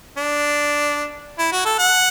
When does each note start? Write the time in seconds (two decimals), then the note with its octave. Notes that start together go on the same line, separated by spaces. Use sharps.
0.17 D4
1.39 E4
1.52 F#4
1.65 A4
1.79 F#5